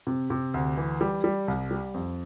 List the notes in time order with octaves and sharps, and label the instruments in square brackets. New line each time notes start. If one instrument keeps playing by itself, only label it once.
[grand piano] C3
C3
D2
E3
G3
G3
C2
G3
F2